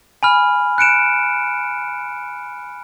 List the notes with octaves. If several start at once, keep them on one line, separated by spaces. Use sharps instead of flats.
G#5 B5 F6
F#6 C#7 D7 E7